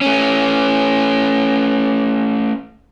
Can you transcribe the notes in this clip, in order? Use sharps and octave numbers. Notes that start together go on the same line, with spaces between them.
A3 C#4